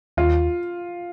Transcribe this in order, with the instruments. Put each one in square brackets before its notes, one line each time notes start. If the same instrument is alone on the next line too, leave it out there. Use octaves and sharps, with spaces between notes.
[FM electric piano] D#2 [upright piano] F4